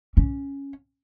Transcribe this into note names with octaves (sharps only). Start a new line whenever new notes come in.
C#4